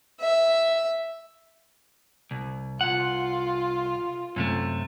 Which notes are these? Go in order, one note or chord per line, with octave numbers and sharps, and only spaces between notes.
E5
C2
C2 F4 F#5
F#2 C3 A3